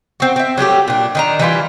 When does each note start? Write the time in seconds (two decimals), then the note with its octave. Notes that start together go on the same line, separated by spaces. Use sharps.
0.20 C4 F#4
0.36 C4 E5
0.58 F#3 G3 A3 G4
0.88 A#2 D4
1.15 D#3 D4 A#5
1.39 E3 G3 E4 F4